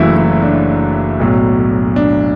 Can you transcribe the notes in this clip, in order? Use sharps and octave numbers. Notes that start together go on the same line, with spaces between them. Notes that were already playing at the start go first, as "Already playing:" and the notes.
Already playing: F#1 F#2 E3 A3 E4 F#4
E4
D4
B1 A2 F#3
D4